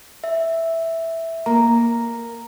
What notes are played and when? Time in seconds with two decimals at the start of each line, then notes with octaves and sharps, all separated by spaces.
0.24 E5
1.46 A#3 A#5